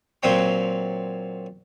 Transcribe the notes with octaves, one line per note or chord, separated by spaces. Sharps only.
A#2 F#3 C4 C#5 G5 C#6